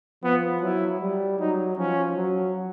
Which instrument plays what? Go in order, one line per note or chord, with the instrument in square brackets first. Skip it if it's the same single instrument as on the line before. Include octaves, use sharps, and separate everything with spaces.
[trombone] F3 [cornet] B3
[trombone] F#3 [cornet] E4
[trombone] G3
[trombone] F#3 [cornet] D#4
[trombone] F3 [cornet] C#4
[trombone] F#3